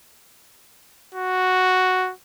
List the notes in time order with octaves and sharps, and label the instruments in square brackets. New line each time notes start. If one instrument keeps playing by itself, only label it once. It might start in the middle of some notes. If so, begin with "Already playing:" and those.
[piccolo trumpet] F#4